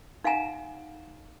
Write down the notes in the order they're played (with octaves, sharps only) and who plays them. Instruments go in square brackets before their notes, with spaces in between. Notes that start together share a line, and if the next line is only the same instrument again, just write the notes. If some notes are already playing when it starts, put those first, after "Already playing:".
[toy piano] D#4 F5 F#5 G#5 A#5